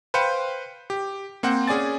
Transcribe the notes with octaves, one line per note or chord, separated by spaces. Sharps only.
B4 C5 F5 G5 C#7
G4
A#3 C4 C5 F#5
C#4 G#4 D5 G#5 A6